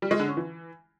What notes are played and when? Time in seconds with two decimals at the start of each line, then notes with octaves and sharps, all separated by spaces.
0.02 G3
0.11 G#3
0.20 D3
0.28 C#4
0.37 E3